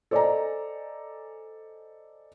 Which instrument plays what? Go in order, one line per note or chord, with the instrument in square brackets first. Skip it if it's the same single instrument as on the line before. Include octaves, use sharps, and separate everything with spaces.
[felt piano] A4 C5 D5 D#5 G#5 A#5